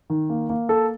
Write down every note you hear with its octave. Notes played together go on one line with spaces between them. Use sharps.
D#3
A#3
A#3
A4